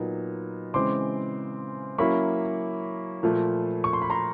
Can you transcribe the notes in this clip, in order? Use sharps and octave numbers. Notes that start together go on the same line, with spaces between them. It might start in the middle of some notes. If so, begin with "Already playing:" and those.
Already playing: A#2 F#3 B3 D#4
C#3 E3 G#3 C4 C6 D6
F#3 A#3 C#4 E4 B5 C#6
A#2 F3 A3
C#6
C6
B5
A#5 C6